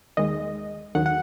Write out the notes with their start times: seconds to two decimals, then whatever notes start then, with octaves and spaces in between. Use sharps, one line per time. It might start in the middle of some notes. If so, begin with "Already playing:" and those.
0.17 D#2 D#3 G#3 D#5
0.95 D#2 D#3 F#3 F#5
1.06 F#5